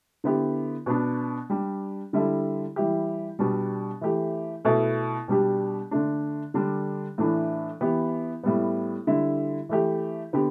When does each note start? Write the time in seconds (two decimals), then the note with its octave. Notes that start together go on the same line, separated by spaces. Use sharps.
0.24 D3 B3 E4 G4
0.86 B2 B3 D4
1.50 G3 D4 G4
2.13 D3 G3 E4 A4
2.76 E3 G3 E4 G4
3.39 B2 G3 D4
4.01 E3 A3 G4
4.65 B2 A3 E4 A4
5.28 B2 G3 D4 G4
5.91 D3 A3 D4
6.54 D3 G3 D4
7.18 A2 E3 A3 D4
7.81 E3 B3 G4
8.44 A2 G3 B3
9.07 D3 G3 E4
9.69 E3 A3 G4
10.33 D3 B3 G4